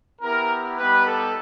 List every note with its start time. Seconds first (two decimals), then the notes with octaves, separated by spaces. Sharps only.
0.21 B3 E4 G4 A#4
0.77 G3 B3 D#4 G4 B4
1.05 A4